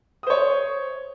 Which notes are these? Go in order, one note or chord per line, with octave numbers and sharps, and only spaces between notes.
C5 C#5 D#6